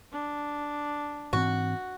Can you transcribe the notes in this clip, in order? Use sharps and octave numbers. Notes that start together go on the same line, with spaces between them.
D4
G#2 E3 C4 F#4